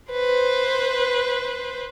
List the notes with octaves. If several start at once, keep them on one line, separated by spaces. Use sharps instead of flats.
B4 C5